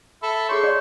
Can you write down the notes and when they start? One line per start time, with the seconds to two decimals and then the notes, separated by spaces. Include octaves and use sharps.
0.23 A4 E5 B5
0.49 G#4 C#5 C6 C#6
0.63 C#5 D5 F5